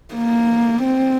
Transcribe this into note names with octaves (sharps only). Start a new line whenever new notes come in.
A#3
C4